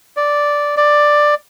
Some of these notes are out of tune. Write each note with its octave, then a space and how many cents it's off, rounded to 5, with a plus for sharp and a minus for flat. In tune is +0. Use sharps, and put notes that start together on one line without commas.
D5 -5
D5 +10